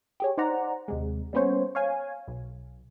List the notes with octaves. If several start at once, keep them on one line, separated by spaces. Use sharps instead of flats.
G4 G#4 C#5
D#4 C5 D5 F#5 A#5
D#2 C3 G#3
G3 A#3 B3 C#4 C5 C#5
C#5 F5 G#5
B1